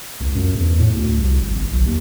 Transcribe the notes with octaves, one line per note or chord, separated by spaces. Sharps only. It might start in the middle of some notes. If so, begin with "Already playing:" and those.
C#2
F#2
E2
A2
D2
C2
G#1
G1
B1
D#2